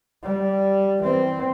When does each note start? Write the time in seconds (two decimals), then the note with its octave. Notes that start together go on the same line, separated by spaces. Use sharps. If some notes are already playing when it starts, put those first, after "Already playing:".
0.24 G3
1.03 E3 C4